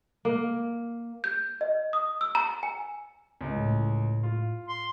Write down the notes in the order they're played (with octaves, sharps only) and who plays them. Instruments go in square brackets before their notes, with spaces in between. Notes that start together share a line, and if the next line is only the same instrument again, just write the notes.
[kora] A#3
[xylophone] G6
D#5
D#6
E6
A#5
G#5
[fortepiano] C#2 D#5
[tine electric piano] A2
[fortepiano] F4
[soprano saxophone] C6